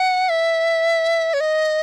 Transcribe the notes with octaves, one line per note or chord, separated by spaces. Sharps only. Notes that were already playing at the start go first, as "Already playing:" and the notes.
Already playing: F#5
E5
C#5
D#5